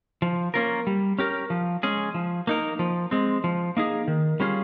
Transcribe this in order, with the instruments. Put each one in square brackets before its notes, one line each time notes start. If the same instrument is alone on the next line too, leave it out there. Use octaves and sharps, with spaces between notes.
[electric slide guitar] F3
A#3 C#4 F4 A#4
G3
C#4 G4 A#4
F3
G#3 C#4 G#4
F3
A#3 D#4 A#4
F3
G#3 C4
F3
A#3 D#4 G#4
D#3
G3 C#4 F4 G#4